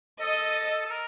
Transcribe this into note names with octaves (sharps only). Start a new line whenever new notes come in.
A4 D#5
A4
A#4